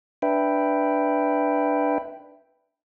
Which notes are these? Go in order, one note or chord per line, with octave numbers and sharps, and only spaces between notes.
D4 B4 E5 G5